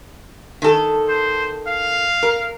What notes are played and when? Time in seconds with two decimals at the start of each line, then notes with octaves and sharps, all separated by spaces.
0.62 D#3 A4
1.08 C5
1.67 F5
2.23 A#4